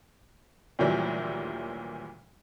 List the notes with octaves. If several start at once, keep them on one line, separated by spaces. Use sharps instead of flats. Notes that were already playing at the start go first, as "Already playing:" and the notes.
D2 A#2 D#3 E3 F#3 G3